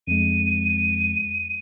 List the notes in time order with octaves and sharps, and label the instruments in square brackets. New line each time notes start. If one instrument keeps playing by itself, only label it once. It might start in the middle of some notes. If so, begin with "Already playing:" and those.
[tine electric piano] F2 G#3 [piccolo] D#7